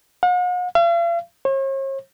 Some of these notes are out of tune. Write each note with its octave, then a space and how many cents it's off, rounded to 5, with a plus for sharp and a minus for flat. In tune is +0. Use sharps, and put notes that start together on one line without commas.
F#5 -45
F5 -45
C#5 -45